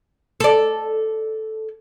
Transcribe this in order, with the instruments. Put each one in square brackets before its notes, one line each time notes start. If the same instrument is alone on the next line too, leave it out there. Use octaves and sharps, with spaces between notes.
[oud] A4 D5